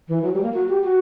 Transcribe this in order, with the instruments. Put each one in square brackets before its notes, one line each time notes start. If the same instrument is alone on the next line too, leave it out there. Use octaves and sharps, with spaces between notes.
[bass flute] E3
F#3
G3
A#3
F#4
G4
F#4